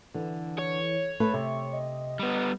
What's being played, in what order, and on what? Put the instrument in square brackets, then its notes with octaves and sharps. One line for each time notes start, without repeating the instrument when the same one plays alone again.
[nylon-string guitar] D3 [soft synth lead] E3
[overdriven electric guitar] C#5
[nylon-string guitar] A3 A4 B4
[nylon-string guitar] C3 [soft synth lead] E5
[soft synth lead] D#5
[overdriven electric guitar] G3 B3